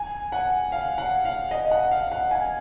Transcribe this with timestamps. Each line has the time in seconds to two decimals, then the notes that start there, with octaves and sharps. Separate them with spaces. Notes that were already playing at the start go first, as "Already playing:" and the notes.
Already playing: G#5
0.32 F#5
0.72 F5
0.98 F#5
1.25 F5
1.51 D#5
1.71 F#5
1.91 F5
2.12 F#5
2.31 G#5